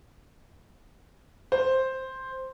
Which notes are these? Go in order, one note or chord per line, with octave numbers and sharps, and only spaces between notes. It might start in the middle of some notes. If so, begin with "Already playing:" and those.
C5